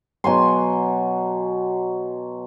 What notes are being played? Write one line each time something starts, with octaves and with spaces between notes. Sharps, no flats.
B2 F#3 G#5 C6